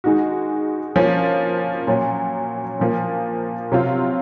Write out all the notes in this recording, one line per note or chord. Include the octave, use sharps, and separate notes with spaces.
D#3 G#3 D#4 F#4
F3 A#3 C#4
A#2 F#3 C#4
A#2 F3 A#3
C3 F#3 C4 F4